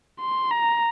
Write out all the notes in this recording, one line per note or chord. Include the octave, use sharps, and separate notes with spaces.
C6
A#5